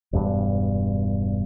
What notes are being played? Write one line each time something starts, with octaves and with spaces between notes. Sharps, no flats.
E1 G2